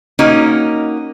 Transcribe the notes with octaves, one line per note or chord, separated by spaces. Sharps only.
A#3 C#4 D#4 F#4